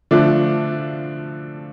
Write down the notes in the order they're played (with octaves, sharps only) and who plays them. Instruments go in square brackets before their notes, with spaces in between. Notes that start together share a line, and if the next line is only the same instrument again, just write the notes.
[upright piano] D3 F3 A3 D4 F4